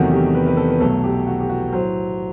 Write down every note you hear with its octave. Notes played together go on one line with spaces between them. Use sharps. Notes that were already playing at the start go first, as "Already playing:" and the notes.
Already playing: E2 C3 D#3 F#3 A3 F#4
G4
B4
B4
A4
B4
B1 B2 F#3 A3 A4
G4
F#4
G4
F#4
A2 F#3 C5